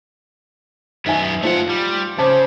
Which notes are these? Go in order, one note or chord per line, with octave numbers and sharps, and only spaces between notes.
F#2 B3 D#4 E5 G#5
A3 F4 C5 F#5
G3
C#3 C5 A5 D6